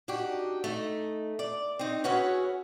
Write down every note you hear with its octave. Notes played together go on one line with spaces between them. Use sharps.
D4 D#4 F#4 G4
A3 D#4
D5
C4 D#4
C#4 E4 F#4 G#4 B4 C#5